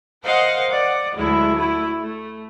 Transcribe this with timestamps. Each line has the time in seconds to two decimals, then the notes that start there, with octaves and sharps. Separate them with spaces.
0.24 A#4 C5 D#5 F5 F#5
0.71 D5 F#5
1.17 D2 F#3 G#3 E4
1.57 A3 E4
2.00 A3